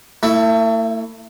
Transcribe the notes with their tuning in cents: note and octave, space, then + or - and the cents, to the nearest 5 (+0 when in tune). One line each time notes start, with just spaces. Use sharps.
A3 +40 E4 +0